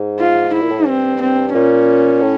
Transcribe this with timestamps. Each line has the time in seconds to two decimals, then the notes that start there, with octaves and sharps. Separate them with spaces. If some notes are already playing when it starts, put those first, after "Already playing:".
Already playing: G#2
0.20 F4
0.54 E4
0.62 A#2
0.70 A2
0.79 G#2
0.87 G2 C4
1.21 C4
1.54 A#2 C#4
2.22 A2